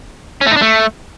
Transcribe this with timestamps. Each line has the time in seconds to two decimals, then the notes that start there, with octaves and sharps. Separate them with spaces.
0.41 C#4
0.46 A3
0.51 D#4
0.56 D4
0.61 A3